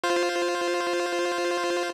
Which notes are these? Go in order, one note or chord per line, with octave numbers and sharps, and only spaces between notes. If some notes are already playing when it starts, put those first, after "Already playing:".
F4 C5